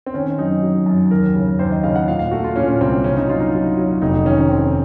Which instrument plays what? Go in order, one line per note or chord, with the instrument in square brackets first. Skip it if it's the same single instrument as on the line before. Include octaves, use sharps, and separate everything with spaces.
[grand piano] C4
D#3 C#4
F#2 D#4
F#3
F#2
D#2 A#4
C#3
D#2 C5
D#5
C#3 F5
F#5
A#2 F5
F5
A3 F#4
F4
A#2 C#4
C2 C4
C#3 C#4
D#4
F#3 F4
D#4
F#3 F4
F#3
F1 D#4
D#3 C#4
D#3 C4